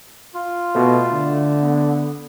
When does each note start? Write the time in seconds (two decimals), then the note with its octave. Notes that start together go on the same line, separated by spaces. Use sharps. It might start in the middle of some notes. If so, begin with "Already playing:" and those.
0.35 F4
0.75 B2 A3
1.12 D3
1.61 B3